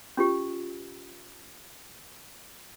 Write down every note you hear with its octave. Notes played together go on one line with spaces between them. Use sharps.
C#4 F4 G4